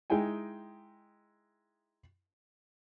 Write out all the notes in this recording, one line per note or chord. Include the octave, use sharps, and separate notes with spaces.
G#3 D#4 E4 G5 G#5